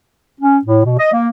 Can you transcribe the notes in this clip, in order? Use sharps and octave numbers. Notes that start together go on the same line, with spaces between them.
C#4
A2
B2
D#5
A#3